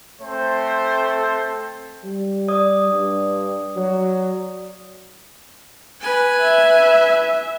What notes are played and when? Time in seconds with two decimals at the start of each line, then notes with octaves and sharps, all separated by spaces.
0.22 A3 C4 A4 C5
2.03 G3
2.48 D5 D#6
2.92 G2
3.76 F#3
6.00 B4 G#5
6.42 E5